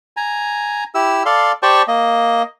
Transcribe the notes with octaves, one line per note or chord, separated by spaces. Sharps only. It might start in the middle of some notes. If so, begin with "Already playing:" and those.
G#5 A#5
E4 G4 E6
A4 D5 F5 C6
G4 C5 D5 G5 A5 C#6
A#3 D#5